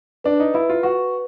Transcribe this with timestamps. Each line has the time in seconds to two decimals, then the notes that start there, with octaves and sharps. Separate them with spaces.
0.24 D4 B4
0.40 D#4
0.54 E4 B4
0.69 F4
0.83 F#4 B4